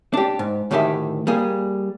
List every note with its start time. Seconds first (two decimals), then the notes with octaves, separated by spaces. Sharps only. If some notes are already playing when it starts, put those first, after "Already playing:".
0.14 D4 G4
0.39 G#2
0.71 D2 A2 D#3 G4 G#4 E5
1.27 G3 A#3 G#4